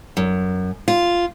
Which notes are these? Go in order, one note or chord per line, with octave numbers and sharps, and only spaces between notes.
F#2
F4